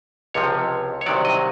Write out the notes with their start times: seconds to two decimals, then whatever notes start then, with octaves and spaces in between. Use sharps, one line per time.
0.34 C#2 C3 F3 C#5
1.01 C#5
1.06 C2 C3 D#3 F#3 D5
1.25 D#5